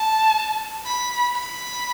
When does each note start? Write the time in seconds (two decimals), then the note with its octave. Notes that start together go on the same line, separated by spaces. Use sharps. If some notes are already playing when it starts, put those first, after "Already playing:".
Already playing: A5
0.85 B5
1.35 B5